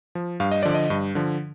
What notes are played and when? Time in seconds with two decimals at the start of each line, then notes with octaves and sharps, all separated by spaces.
0.15 F3
0.40 G2 F5
0.52 D#5
0.63 D3 F3 D5
0.74 D#5
0.90 G2
1.15 D3 F3